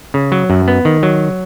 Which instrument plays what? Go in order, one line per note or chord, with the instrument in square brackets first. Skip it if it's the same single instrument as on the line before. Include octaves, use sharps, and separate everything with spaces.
[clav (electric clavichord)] C#3
F#3
F#2
B3
D#3
F#3